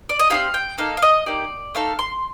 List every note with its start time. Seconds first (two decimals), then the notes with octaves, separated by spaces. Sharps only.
0.09 D5
0.19 D#5
0.30 C4 D#4 G4 F5
0.54 G5
0.78 A#3 D#4 A4 F5
0.97 F5
1.02 D#5
1.26 A#3 D#4 G4 D5
1.75 A3 D#4 A4 F5
1.99 C6